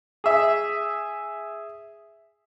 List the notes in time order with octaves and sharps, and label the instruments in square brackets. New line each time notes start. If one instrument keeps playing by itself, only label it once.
[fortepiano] G#4 E5